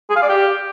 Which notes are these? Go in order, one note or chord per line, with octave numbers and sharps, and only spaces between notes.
G#4
F5
D5
G4